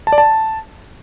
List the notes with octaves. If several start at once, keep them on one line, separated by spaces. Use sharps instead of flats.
A5
D5
A5